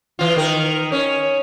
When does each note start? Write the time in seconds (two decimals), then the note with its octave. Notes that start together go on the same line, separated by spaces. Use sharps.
0.19 E3 F4
0.36 D#3 A#4
0.92 C#4